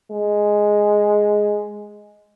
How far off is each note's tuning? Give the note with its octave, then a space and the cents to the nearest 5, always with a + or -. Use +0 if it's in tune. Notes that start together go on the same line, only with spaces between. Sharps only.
G#3 +0